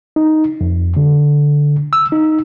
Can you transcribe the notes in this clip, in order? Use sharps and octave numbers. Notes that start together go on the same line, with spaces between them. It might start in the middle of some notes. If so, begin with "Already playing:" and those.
D#4
F2
D3
E6
D#4